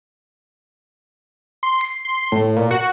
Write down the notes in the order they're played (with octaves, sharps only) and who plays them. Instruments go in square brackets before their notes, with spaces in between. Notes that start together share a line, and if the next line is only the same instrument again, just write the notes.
[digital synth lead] C6
C7
C6
A2
A#2
F#4